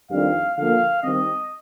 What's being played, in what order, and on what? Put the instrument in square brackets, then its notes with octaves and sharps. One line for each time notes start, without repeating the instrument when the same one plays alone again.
[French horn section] F2 D#3 G3 D4 G4 [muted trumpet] F5
[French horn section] D3 F3 A#3 [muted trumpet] F5
[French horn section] D#3 G3 C4 [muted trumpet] D#5